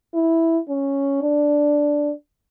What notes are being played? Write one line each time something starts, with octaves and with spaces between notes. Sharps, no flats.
E4
C#4
D4